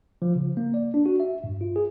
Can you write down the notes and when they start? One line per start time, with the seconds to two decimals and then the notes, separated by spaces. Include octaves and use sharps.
0.22 F3
0.35 C#3
0.57 A#3
0.74 D5
0.94 D4
1.06 F#4
1.20 E5
1.44 G2
1.61 F4
1.76 G#4